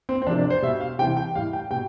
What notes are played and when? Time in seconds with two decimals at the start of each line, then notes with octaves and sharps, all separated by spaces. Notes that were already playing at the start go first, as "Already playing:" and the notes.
0.09 C4
0.22 C4
0.27 C3 F3 D4
0.38 D4
0.50 C5
0.62 B2 G3 E5
0.80 F5
0.99 C3 E3 G3 G5
1.17 G5
1.35 A2 G3 F5
1.53 G5
1.70 B2 G3 G5